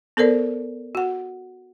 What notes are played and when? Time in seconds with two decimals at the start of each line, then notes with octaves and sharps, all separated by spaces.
0.17 B3 A4 A#4 C5 D5
0.95 F#4 F#5